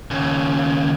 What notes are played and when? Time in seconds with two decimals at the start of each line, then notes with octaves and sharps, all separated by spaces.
0.11 D#2 C#3